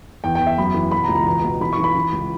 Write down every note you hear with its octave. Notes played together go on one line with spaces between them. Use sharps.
E2 G5
G5
E2
E5
F#2 B5
E3
B2 B5
A#5
C#2
A#5
E2 A#5
B2
E3 B5
C#6
E3
B5
E3
C#2